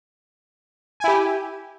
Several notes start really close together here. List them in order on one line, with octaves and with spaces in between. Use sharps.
G#5 E4 G4